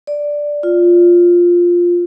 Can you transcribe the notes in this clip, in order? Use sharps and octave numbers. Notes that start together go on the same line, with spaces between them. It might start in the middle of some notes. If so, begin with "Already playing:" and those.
D5
F4